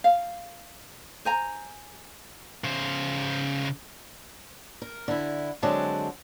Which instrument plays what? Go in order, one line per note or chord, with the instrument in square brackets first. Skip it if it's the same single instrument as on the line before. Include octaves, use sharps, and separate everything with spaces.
[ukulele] F5
C5 G#5 A#5
[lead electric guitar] C#3 C5
[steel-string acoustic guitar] A#4
D3 E4
D3 F#3 G#3 C4 A5